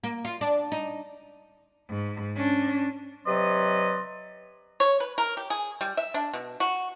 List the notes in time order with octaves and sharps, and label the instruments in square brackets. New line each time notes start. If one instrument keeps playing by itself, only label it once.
[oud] A#3
F4
D4
D#4
[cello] G#2
C#4 D4
[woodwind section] C3 F#3 B4 D5 D#5 C6
[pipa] C#5
B4
A#4
G4
G#4
G3
E5
D4
B2
F#4